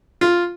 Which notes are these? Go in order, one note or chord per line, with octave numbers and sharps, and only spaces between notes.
F4